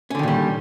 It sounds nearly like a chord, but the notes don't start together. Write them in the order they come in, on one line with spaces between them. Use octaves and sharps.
C#4 D3 D#3 A#2 G3